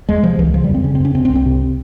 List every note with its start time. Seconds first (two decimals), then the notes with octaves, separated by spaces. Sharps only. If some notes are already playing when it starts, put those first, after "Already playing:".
0.09 E2 G#3
0.23 C3 F3
0.39 C#2 E3
0.54 C#3 F3
0.64 G3
0.69 F2
0.74 C4
0.84 C#3 C#4
0.95 C4
1.00 F2 C#4
1.15 C3 C4
1.25 C4
1.30 C2
1.35 C4
1.46 C3